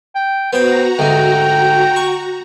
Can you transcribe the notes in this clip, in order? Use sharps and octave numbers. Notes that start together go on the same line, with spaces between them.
G5
B3 F#4 C5 G5 A#5
D2 G#2 G5
C#6